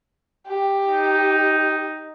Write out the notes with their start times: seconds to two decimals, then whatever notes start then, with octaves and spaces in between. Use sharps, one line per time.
0.48 G4
0.87 D#4